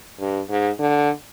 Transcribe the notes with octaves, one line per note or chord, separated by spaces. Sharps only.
G2
G#2
D3